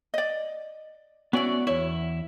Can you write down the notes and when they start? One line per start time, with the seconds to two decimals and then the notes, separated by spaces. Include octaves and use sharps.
0.14 D5 D#5
1.33 B3 C#4 E4 F#4 D5
1.67 E2 E4 C#5